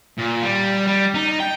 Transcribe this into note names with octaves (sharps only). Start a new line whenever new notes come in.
A#2
G3
G3
D#4
G5